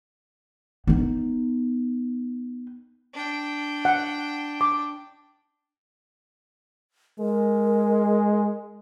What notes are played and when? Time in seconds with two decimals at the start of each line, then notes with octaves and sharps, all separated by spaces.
0.87 B3 D#4
3.14 D4 G5
3.85 F#5
4.61 D6
7.19 G#3 A#4